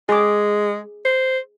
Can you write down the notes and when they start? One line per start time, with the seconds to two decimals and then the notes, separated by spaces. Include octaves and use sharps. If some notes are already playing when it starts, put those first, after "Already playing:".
0.09 G#3 G#4 D6
1.05 C5